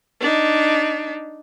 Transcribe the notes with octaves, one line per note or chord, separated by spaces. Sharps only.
D4 D#4